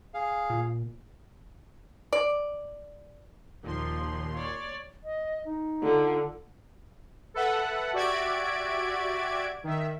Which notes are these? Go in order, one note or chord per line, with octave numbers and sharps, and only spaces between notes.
G#4 F5
A#2
D5
D#2 A#2 F3 C6
C#5 D5 A6
D#5
D#4
D3 F4
A4 B4 E5 F#5
F#4 G4 D5 E5 G#6 D7
D#3 E5